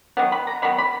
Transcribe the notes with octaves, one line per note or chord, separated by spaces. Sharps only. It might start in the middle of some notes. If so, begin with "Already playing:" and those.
D#3 F#3 B3
B5
A#5
D#3 F#3 B3 B5
B5